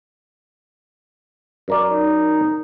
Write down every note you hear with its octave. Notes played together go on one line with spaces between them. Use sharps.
F#2 A#4 D5
D#4